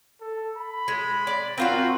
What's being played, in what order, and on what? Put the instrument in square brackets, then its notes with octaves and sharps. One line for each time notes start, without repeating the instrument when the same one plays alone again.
[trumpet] A4
B5
[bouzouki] G#3
D5
[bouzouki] C4 F4 F#4 [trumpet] A#4